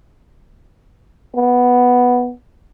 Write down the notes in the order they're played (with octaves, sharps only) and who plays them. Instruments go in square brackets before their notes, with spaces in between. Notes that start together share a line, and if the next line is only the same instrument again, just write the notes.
[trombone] B3